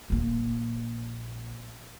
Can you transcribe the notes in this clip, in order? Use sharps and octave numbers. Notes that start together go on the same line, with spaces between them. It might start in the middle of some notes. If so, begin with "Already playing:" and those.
A#1 A#3